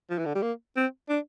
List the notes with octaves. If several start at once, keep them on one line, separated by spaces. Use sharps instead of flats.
F3
E3
D3
G3
A#3
C4
D4